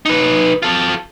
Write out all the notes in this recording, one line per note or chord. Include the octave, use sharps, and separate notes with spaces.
D#4 B4
F4 A4